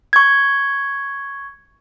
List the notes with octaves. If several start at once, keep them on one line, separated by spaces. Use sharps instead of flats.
C#6 G#6